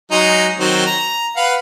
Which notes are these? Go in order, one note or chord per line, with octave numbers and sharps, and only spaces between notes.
F#3 G#3 D#4
D#3 F#3 C4
A#5
B4 F5 F#5